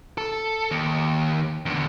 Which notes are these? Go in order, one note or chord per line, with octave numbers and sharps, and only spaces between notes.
A4
D#2
E2 D3